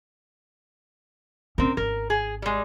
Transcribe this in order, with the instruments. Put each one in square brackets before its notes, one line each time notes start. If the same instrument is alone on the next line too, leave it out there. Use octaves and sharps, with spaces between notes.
[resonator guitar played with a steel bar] C4 A#4 [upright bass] C#4 D#4
[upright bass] G#1 [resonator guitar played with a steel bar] A#4
[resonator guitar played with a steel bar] G#4
G3 G#3